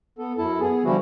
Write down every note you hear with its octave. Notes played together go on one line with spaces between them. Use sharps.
B3 A4
F#2 E4 A4 A5
B3 G#4
D3 E3 F3 G3 E4 F#4